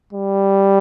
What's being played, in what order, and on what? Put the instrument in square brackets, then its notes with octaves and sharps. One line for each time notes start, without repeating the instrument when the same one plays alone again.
[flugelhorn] G3